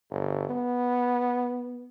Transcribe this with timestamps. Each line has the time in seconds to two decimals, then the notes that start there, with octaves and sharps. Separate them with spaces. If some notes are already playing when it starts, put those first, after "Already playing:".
0.11 G1
0.49 B3